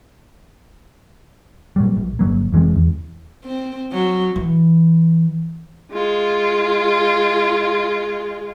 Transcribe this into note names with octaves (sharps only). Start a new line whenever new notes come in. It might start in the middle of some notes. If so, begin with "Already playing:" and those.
A#2 F#3 G3
A#1
G1 E2 F#3 A#3
F1 E3 G#3 C4
E2
C4
F#3
E3
G#3 F4